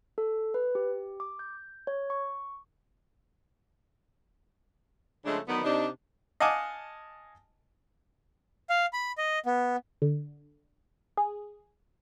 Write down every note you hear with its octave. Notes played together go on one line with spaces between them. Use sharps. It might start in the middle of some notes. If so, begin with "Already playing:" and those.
A4
B4
G4
D6
G6
C#5
C#6
C#3 F3 G#3 A3 C#4 D4
D3 D#3 F#3 B3
C3 D4 D#4
D#5 F5 F#5 G#5 A5 D6
F5
B5
D#5
B3
D3
G#4